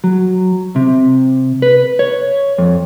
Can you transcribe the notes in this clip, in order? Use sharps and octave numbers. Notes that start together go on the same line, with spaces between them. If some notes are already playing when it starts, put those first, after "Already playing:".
F#3
C3
B4
C#5
F2